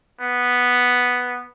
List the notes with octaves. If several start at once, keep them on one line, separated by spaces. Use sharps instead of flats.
B3